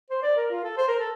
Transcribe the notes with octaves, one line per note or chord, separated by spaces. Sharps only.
C5
D5
A#4
F4
A4
C5
A#4
A4